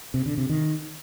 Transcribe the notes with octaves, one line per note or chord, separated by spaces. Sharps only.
C3
D3
C3
D#3